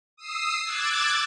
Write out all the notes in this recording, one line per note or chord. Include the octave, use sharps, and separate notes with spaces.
D#6 E6 C7
D6 E6 F#6 G#6 A6